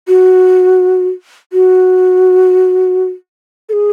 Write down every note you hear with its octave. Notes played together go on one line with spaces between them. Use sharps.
F#4
F#4
A4
G#4